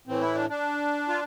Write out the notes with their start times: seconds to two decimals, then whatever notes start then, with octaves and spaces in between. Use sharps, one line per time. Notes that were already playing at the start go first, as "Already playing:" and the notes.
0.07 A2 E3 C4
0.21 E4
0.35 D4
0.50 D4
1.08 F4